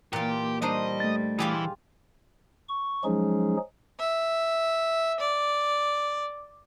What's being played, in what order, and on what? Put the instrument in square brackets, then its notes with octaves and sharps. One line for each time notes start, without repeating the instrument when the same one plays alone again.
[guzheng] A#2 F4 [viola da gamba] E3 A#3 [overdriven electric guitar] G4
[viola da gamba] G3 [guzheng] D4 D#4 C5 [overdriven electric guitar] D#5
[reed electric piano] A3 A6
[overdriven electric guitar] E3 [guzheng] F4 G4 G#4
[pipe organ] C#6
F3 F#3 G#3 C#4 D#4 G#4
[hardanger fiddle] E5
D5